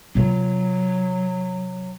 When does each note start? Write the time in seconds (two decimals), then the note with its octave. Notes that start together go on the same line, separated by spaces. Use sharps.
0.15 C3 F#3 F4